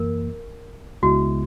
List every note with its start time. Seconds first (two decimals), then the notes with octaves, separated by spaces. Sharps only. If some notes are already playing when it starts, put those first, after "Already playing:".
Already playing: F#2 E3 A#3 A#4
1.02 C#2 C#3 G#3 B3 E4 F#4